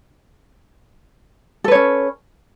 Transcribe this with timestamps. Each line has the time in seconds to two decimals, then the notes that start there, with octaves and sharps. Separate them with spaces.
1.64 A4
1.68 B4
1.71 C#5
1.75 C#4